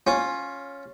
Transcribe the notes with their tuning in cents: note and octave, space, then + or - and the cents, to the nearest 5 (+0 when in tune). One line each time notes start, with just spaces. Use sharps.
C#4 +0 F4 +15